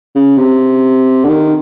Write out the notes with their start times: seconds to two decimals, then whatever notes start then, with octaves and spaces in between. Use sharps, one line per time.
0.15 C#3
0.38 C3
1.24 D3
1.30 D#3